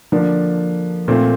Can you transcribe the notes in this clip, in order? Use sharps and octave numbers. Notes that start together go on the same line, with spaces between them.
D3 F3 A#3 D4
A#2 A3 C4 F4